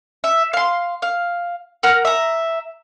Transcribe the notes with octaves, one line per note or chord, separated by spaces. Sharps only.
E5
F5 C6
F5
A#4 F#5 A#5 F6
E5 A#5